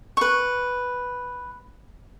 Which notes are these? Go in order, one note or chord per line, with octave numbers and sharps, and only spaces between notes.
B4 C#6